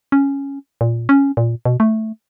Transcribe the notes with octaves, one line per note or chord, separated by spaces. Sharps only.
C#4
A#2
C#4
A#2
B2
A3